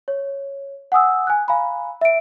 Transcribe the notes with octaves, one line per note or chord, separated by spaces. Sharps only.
C#5
F#5 G#5 D#6 E6
G#5 F#6
F5 G#5 A#5 B5
E5 D7